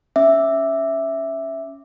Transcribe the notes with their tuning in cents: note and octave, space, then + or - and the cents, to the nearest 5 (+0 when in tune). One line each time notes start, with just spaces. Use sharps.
C#4 +0 E5 +0 D6 +0